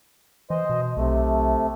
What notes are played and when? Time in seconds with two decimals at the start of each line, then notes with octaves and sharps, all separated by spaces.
0.50 E3 C5 D#5
0.70 B2
0.97 B1 C3 A3